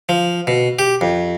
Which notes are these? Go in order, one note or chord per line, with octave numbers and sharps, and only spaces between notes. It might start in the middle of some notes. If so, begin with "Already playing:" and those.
F3
B2
G4
F2